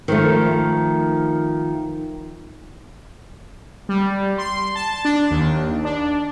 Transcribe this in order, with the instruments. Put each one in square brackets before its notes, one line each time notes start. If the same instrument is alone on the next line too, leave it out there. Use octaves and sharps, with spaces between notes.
[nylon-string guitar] D#3 F3 A3
[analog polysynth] G3
C6
A5
D4
D#2
D4